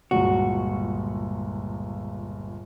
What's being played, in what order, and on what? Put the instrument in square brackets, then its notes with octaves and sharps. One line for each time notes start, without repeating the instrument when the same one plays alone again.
[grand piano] G1 C#2 A#2 [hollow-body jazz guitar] F#4